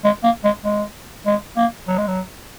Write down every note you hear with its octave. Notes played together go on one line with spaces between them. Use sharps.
G#3
A#3
G#3
G#3
G#3
A#3
F#3
G#3
F#3